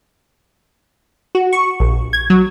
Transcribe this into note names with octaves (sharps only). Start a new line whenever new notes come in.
F#4
C#6
A#1
G#6
F#3